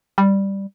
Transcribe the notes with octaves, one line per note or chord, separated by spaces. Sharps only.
G3